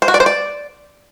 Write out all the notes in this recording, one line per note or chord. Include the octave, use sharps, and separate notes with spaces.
C5
F#4
D5
C5
D5